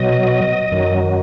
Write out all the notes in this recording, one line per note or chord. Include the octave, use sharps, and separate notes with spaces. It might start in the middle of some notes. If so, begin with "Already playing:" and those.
Already playing: B2 F#3 D#5
F#2 D#3 F#3